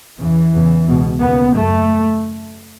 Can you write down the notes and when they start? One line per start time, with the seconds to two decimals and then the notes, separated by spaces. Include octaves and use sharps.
0.19 E2 C#3 E3
0.53 E2 C#3
0.88 C#2 B2
1.22 D#2 C#3 B3
1.56 F#2 A3